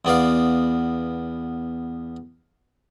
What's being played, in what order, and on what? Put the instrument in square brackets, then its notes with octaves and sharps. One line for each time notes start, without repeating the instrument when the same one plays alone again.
[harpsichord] E2 B3 D5 F5